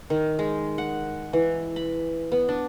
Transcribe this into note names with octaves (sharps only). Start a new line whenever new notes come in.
D#3
G#3
F#5
E3
B5
B3
D4